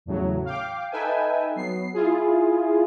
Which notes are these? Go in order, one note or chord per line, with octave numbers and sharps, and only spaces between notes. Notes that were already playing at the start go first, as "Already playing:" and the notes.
E2 A2 C#3 F#3
F5 G5 D6
D#4 A4 B4 E5 G5 G#5
F#3 B3 C7
E4 F4 G#4